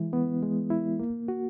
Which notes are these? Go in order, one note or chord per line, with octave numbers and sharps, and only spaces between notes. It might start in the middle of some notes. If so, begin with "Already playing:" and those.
Already playing: E3 G#3 E4
B3
G#3
E4
A#3
F#4